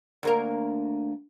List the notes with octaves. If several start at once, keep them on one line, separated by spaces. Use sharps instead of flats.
D2 A#3 A#4